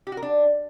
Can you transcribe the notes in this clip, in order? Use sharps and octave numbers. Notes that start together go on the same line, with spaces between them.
G4
F#4
A#4
D4